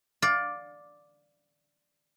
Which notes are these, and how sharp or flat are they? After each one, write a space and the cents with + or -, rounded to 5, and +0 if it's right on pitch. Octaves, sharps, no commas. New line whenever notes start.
D5 +0 F5 +25